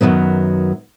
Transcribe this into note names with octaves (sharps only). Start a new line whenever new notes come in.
F#2 A#2 D#3 F#3 B3